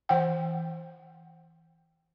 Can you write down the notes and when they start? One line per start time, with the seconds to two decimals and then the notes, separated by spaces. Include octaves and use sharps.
0.09 E3 F#5 G5